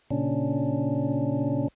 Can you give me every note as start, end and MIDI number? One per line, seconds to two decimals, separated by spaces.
0.11 1.68 46
0.11 1.68 49
0.11 1.68 61
0.11 1.68 62